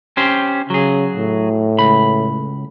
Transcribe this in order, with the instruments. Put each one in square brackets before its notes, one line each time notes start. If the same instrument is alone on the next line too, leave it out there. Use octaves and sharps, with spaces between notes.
[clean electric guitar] C#4 G4 C5
[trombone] C#3 [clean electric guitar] F#3 G#4
[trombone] A2
[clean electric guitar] C#2 B5